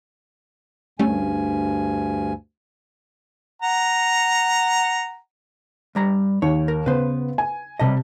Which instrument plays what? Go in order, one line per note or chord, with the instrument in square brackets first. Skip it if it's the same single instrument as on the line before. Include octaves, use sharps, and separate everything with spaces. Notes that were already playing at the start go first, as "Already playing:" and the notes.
[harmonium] D2 G2 G#5 [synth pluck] G3 A3 C#4
[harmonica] F#5 A#5
[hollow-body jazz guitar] G2 G3 A#5
[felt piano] D#2 [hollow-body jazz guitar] C#5
[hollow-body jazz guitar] A#4
[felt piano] C#3 B3 [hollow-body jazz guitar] B4 C5
[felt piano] G#5
[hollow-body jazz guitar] B1 G3 D#5 [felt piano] C3 A5